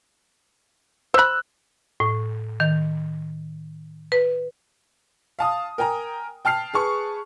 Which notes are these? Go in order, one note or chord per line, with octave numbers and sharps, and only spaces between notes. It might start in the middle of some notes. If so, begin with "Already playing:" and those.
C5 B5 E6 F#6
A2
D#3
B4
F5 A5 D#6
A#4 G5 G#5 A#5
G5 A5 F6 C7
G#4 B4 A5 C#6